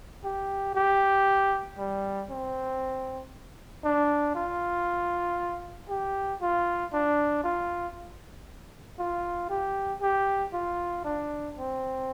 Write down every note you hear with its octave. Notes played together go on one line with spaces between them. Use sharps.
G4
G4
G3
C4
D4
F4
G4
F4
D4
F4
F4
G4
G4
F4
D4
C4